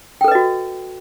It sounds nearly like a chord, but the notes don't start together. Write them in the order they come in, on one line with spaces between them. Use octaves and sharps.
G5 A4 B4 D#5 F#4